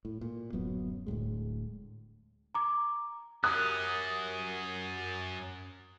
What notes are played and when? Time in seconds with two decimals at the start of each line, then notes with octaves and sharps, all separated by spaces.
0.05 A2
0.21 A#2
0.53 D1 F#2 F#3 B3
1.07 D1 D2 A2 G#3
2.55 A#5 D6
3.44 F#2 C#4 G4 A#4 D#6 F#6